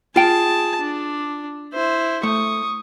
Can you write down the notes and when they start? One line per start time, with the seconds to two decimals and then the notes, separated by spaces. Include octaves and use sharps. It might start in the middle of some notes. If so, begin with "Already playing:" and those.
0.16 F4 G#4 G5 A5
0.81 D4
1.73 E4 C5
2.23 A3 C#6 D#6